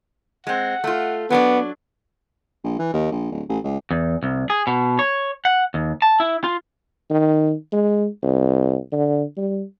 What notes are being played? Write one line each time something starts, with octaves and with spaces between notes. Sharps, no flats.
G#3 C4 F#5
A3 F4
F#3 B3 D4 D5
A#1
E3
D#2
A#1
D1
A1
C#2
E2
C2
G#4
B2
C#5
F#5
D#2
A5
E4
F4
D#3
G#3
C2
D3
G3